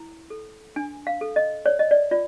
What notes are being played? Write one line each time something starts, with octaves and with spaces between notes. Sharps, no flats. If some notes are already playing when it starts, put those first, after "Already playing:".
Already playing: E4
A4
D4 G#5
F5
A4
D#5
C#5 D5
D#5
D5
F4 D5